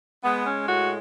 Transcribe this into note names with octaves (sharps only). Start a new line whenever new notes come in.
G#3 B3
C#4
A2 F#4